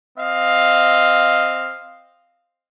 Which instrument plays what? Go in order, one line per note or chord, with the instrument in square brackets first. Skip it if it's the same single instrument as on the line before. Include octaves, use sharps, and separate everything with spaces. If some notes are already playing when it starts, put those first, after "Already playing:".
[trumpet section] C4 D#5 F5